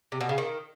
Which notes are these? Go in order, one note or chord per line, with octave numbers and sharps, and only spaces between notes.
C3
B2
C#3
D#3